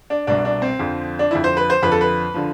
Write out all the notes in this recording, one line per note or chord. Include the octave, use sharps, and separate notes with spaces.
D4
C2 B2 D4
D4
C4
F2 D3 F3
D4
F2 D3 F3 E4
C5
B4
C5
F2 D3 F3 B4
A4
B4
D3 F3